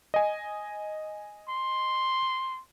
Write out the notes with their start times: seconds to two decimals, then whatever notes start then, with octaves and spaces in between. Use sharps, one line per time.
0.14 D#5 G#5
1.49 C6